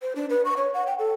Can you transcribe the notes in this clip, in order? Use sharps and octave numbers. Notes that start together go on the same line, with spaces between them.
C5
D4
B4
C#6
C#5
F#5
G5
A4